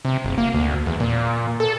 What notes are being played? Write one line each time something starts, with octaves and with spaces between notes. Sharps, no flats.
C3
F#1
A#3
D2
E2
A#2
A4